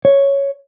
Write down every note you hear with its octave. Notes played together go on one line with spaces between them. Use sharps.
C#5